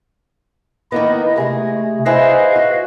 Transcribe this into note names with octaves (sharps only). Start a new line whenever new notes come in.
D#3 A#3 B3 E4 D#5
C3 G#3 A3 G#4
E4 G#4 B4 C5 D#5 F5
F#4